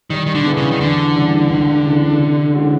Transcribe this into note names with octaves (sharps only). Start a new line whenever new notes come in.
D#3 G3
D#3
D3
B3 E4 G#4
C#3
D#3
E2 D3
C#3 E3 G3
C#2
C#3 E3
C3
E3 G#3 C#4 F#4